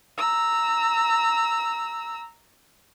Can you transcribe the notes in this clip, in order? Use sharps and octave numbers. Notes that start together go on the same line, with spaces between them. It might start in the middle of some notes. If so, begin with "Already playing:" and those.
A#5 E6